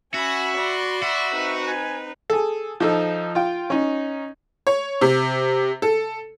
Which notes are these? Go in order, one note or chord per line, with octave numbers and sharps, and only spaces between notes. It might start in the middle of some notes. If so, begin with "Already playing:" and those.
C#4 F#4 E5 G#5 B5
D5 B5 C6
F#4 E5
C4 D#4 B4
G#5
G#4 A4
F3 D#4 A4
F4 G5
C#4 D#4
C#5
C3
A4